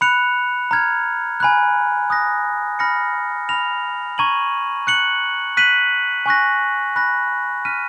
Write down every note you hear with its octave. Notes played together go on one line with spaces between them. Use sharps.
B5 F#6 C#7 F7
A#5 F6 G#6
G#5 B5 F#6
D#6 F#6 A#6
B5 F6 A#6 C#7
B5 F6 A#6 F7
A#5 C#6 G#6 D#7 F#7
F#6 C#7 F#7
F#6 B6 D#7 F#7
G#5 C#6 F#6 A#6
B5 F#6 A#6
F6 B6 D#7